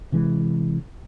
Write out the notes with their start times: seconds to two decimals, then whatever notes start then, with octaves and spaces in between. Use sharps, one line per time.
0.12 C3 E3 G#3